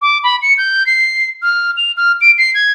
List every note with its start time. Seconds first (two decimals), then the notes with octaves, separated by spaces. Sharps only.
0.02 D6
0.24 B5
0.42 C#7
0.58 G6
0.86 C7
1.42 F6
1.77 F7
1.97 F6
2.21 D7
2.38 C7
2.55 G#6